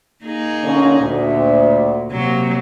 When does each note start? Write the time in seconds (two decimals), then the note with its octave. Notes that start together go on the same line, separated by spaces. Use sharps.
0.24 A#3 D#4 G#4
0.65 A#2 D3 C#4
1.02 D2 A#2
2.11 C3 F#3 A#3